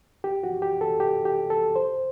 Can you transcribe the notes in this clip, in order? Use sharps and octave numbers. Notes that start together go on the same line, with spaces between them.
G4
F#4
G4
A4
G4
G4
A4
C5